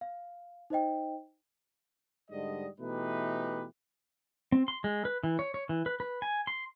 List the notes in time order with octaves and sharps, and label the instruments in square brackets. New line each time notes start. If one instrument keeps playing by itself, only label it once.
[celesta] F5
D#4 C5 D#5 G5
[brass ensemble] G#2 D3 G3 D#5
B2 E3 A3 D#4 G4 B4
[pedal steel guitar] C4
C6
G#3
B4
E3
C#5
C#5
E3
B4
B4
G#5
C6